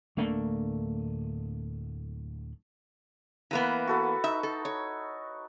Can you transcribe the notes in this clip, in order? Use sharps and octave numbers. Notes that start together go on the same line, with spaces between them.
D1 A3 A#3 D4
E3 A#3 B3 B4 A#5
F#4 A4 B5
D#4 E5
A4
C#5